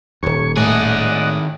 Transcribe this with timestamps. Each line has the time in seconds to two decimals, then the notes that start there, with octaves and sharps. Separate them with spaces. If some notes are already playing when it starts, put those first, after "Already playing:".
0.23 D#1 D#2 C#5 C#6
0.57 A2 D#3 G#4 D5 D#5 F#5